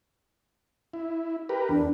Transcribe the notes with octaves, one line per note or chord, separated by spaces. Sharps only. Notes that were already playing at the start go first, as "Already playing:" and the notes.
E4
G4 A#4 B4
E2 D4